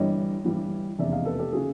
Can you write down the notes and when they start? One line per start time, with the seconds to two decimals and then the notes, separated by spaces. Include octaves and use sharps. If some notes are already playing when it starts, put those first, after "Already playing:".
Already playing: G1 G2 E3 G3 C#5 D#5
0.44 G1 G2 E3 G3
0.98 F1 E2 C#3 D5 E5
1.12 D#5 F5
1.25 A4 B4
1.38 G4 A4
1.53 C#3 F#4 G#4